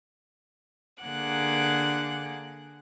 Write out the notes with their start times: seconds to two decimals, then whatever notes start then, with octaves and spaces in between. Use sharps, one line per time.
1.03 D3 A#3 G#4 F#5 D6 F#6